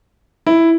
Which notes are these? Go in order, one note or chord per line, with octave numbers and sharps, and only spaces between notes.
E4